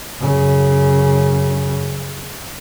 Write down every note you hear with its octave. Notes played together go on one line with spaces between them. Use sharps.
F#2 C#3